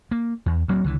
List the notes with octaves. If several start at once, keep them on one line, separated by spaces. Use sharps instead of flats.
A#3
E2
D2 F#3 A#3 C4
C#2 D3 E3